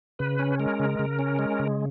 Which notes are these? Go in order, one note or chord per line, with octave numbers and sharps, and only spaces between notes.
C#3 B4
C#4
G#3 A#4
C#3
C#3
C#4
G#3
C#3